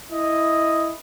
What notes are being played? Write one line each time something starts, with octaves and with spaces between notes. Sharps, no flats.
E4 D#5